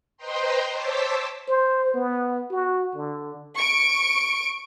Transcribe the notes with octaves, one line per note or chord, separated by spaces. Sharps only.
B4 C5 D#5 G5 A#5 C6
C5 C#5 A5 D6 E6 B6
C5
B3
F#4
D3
C#6 D7